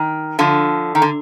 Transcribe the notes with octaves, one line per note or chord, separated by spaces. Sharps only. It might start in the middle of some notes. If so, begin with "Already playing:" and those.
Already playing: D#3
D3 F3
D#3
D3